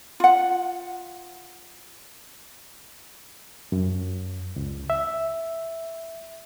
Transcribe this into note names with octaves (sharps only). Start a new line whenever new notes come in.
F4 F#5
F#2
C#2
E5